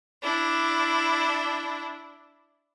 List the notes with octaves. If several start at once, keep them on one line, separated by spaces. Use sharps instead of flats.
D4 E4